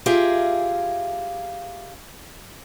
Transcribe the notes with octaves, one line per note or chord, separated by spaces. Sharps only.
F4 G4 G#4 A#4 E5 F5